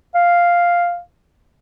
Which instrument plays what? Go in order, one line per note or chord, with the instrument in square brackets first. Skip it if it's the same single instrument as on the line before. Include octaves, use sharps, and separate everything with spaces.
[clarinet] F5